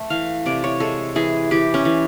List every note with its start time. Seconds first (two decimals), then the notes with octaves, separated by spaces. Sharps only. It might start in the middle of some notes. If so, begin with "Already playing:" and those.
Already playing: A3
0.10 E3 F5
0.46 C3 D5
0.64 C#5
0.80 G#3 A4
1.16 E3 G#4
1.51 E3 G4
1.74 C#4
1.85 E3